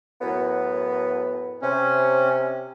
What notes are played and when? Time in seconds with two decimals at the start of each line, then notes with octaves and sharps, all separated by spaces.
0.20 F#2 A2 B3
1.62 C3 C#4